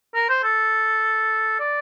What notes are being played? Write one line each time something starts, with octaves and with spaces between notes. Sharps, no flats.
A#4
C5
A4
D5